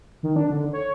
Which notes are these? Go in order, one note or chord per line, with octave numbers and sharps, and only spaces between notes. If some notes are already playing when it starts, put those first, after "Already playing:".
D#3
D4
D3
C#5